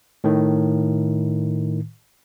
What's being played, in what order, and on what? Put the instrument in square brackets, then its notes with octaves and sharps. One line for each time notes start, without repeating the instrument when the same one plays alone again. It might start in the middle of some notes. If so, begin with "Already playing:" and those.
[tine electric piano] A2 D#3